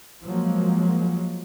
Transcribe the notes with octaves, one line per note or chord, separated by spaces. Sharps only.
F3 F#3 G#3 A#3